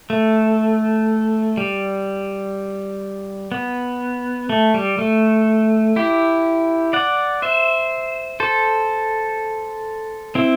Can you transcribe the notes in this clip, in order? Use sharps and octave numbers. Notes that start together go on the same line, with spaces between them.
A3
G3
B3
A3
G3
A3
E4 G4
D5 F#5
C5 E5
A4 C5
C4 E4